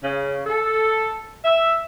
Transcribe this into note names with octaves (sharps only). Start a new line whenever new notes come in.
C#3
A4
E5